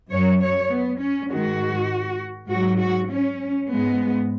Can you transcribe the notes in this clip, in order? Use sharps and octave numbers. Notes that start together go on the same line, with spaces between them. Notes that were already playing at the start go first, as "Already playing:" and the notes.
F#2 F#3 C#5
C#5
B3
C#4
G#2 D#3 G#3 F#4
G#2 F#3 F#4
F#4
C#4
G#2 G#3 B3